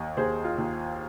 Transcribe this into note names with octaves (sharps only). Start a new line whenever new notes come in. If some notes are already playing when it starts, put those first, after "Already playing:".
Already playing: D#2 D#5
D#2 G#4 C5
F4
D#2